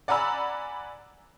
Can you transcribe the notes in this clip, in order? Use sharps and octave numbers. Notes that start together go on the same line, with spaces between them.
D5 F#5 G#5 A#5 B5 E6